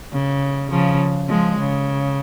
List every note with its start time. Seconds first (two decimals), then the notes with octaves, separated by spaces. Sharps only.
0.13 C#3
0.71 C#3 F3
1.29 F3 G#3
1.59 C#3